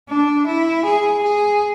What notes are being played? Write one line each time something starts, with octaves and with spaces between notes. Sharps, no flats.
D4
E4
G#4
G#4